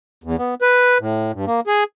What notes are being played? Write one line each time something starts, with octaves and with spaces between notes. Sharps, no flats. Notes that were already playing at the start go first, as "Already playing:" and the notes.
E2
B3
B4
A2
G2
A#3
G#4